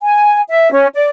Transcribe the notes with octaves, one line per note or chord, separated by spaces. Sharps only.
G#5
E5
C#4
D5